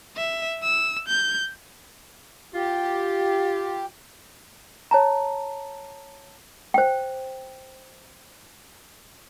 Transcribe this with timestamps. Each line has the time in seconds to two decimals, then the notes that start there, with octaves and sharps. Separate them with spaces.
0.17 E5
0.63 E6
1.08 G6
2.55 F4 G4
4.91 C#5 A5 A#5
6.74 C5 G5